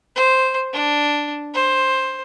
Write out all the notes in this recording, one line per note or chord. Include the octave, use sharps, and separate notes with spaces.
C5
D4
C5